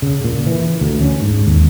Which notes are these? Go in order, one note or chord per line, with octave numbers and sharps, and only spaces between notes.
C#3
A#2
E3
D2
C#4
G#2
D#2